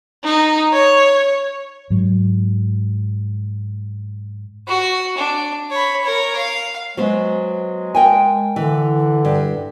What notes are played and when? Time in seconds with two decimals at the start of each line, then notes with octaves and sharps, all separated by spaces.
0.24 D#4
0.73 C#5
1.90 G#2 F#3
4.67 F#4
5.17 D4
5.71 C#5 B5
6.03 A#4 C#5
6.36 F5
6.97 F#3 G#3 B3 C5
7.95 A#4 G5 G#5
8.56 D3 E3
9.25 G2